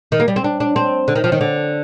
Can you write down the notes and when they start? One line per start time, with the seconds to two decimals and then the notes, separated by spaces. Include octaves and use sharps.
0.12 D#3
0.20 A#3
0.28 G3
0.36 C4
0.44 D4
0.60 D4
0.76 C4
1.08 D3
1.16 D#3
1.24 F3
1.32 D#3
1.41 D3